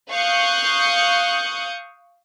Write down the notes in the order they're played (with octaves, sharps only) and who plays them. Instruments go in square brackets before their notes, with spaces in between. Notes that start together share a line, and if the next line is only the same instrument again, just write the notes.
[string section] F5 C#6 D#6 F#6 G6